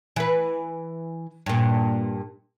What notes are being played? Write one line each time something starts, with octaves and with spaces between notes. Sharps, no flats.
E3 B4
G2 A#2